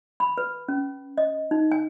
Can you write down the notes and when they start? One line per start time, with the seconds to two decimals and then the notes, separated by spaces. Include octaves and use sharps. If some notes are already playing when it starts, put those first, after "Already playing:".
0.20 B5
0.38 B4
0.68 C#4
1.18 D#5
1.51 D#4
1.72 G#5